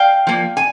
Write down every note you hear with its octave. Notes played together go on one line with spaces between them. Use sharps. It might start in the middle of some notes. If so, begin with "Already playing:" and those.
Already playing: F5 G5
F3 A#3
G#5